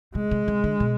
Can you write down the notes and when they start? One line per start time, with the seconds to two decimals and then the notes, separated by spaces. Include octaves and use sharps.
0.15 C3 G#3
0.31 C3
0.48 C3
0.64 D3
0.80 B2